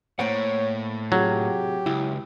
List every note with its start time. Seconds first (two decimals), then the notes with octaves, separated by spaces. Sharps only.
0.19 A2 A#3 C5 C#5 F#5
1.12 C3 F#3 F4 G4 G#4
1.86 C#2 E4